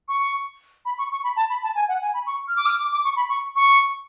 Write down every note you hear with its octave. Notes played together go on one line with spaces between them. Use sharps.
C#6
B5
C#6
C#6
B5
A5
B5
A5
G#5
F#5
G#5
B5
C#6
F6
D6
F6
D6
D6
C#6
B5
C#6
C#6